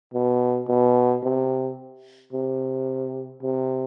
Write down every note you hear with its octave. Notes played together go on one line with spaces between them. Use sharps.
B2
B2
C3
C3
C3